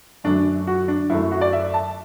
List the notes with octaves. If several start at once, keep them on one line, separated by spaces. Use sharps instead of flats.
F#2 D3 F#3 A3 D4
F#4
D4
F#2 F#3 A3 E4
F#4
D5
E5
A5